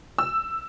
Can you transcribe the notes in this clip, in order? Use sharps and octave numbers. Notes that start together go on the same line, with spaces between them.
E6